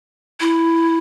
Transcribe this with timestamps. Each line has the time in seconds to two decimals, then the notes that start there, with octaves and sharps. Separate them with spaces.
0.40 E4